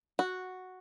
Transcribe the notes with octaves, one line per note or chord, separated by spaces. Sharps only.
F#4